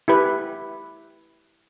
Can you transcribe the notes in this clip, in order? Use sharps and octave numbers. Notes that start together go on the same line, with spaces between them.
E4 G4 B4